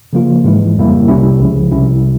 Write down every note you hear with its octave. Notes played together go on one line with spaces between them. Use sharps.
C#3 F3 A#3 F4
G#2 E3 G#3 E4
F2 C#3 G3 A#3 E4
C2 C3 G3 C#4 E4
C#2 C#3 F3
C2 C3 G3 C#4 E4